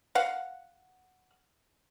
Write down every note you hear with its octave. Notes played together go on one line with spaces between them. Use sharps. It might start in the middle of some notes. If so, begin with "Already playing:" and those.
F5 F#5